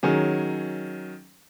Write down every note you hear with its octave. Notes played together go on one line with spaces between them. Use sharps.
D#3 F#3 C#4 G#4